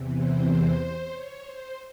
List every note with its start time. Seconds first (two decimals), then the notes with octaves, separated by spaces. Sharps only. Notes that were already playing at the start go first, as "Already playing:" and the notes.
Already playing: E2 C3 E3
0.12 C5
1.09 C#5
1.40 C5